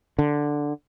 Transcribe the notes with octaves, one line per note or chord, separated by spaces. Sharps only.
D3